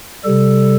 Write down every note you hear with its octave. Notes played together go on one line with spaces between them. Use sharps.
C3 G3 A4